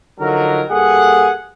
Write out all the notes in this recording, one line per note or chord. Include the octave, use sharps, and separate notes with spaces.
D3 F3 F#3 D#4 A#4
G2 A#3 G#4 A4 F#5